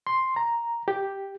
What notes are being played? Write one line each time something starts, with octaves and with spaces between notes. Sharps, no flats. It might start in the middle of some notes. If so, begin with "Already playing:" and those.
C6
A#5
G4